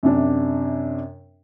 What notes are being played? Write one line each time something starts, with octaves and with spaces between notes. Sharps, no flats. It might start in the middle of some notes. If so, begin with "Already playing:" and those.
F#2 C3 D4